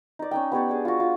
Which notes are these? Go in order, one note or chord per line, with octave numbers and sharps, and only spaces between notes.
D#4 D5
C#4 D#4 G5
B3 G4 C#5 D5
D4 G#4
F4 F#4
F4